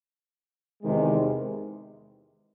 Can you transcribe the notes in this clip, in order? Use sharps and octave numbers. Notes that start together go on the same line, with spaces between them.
E2 C3 D#3 G#3